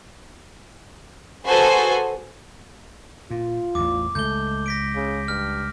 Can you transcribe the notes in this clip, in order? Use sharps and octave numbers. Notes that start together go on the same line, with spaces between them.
F#4 G#4 A4 B4 C5 G#5
A#2 F4
A1 E2 D6
C#2 A3 G6 G7
A#6 B6 D7
C#3
G2 F6